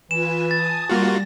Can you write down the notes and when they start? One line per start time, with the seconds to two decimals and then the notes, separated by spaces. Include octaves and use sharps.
0.11 E3 F4 B4 G#5 E7
0.51 G#5 A5 D#6 A6
0.89 G3 A#3 F4 F#4 A#6